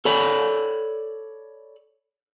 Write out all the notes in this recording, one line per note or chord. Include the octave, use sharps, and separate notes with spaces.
A4 C#5 D5 B5